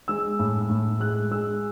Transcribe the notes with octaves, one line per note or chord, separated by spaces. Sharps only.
G#3 E6
A2
A2
G#3 F#6
G#3 E6